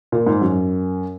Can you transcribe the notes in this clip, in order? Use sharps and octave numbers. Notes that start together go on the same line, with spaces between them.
A#2
G#2
F#2